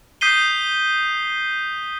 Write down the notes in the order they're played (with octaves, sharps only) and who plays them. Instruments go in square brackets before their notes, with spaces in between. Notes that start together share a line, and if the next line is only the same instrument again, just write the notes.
[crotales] D#6 G6 B6 C7 D#7 G7